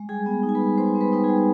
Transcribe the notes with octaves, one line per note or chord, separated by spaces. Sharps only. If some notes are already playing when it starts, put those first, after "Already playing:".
Already playing: G#3
G3 G#4 G#5
B3
D#4
G#5
B4 B5
G3
G3 C5 C6
B3
B4 B5
D#4 G5
G#4 G#5
G3